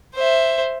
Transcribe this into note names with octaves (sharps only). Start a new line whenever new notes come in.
C5 E5